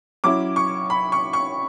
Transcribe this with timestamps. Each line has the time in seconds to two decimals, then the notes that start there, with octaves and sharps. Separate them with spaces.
0.24 F#3 C#4 E4 D6
0.56 C#6
0.90 B5
1.12 C#6
1.33 C#6